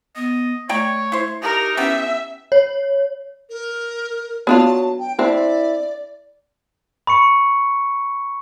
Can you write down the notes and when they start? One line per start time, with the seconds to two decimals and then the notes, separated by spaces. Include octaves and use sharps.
0.16 B3 D#5
0.69 A3 C#5 D5 G5 A#5
1.12 E4 C5
1.43 D#4 G4 A#4
1.77 B3 C#4 E4 G4 E5
2.52 C#5
3.49 A#4
4.47 F#3 B3 D4 F4 A5
4.99 G5
5.19 C4 D4 E4 D5
7.07 B5 C#6 C#7